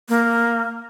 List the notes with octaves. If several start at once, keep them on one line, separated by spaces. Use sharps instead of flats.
A#3